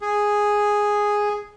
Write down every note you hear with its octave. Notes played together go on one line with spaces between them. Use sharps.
G#4